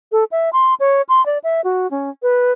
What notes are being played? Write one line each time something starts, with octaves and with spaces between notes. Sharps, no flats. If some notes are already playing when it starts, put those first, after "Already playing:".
A4
E5
C6
C#5
C6
D5
E5
F#4
C#4
B4